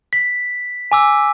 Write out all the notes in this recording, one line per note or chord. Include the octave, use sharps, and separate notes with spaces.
B6
G#5 D6 E6